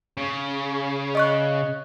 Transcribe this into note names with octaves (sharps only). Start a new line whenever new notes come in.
C#3
D#5 C#6 F#6